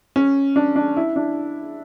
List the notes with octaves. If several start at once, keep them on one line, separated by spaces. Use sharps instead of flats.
C#4
D4
D4
E4
D4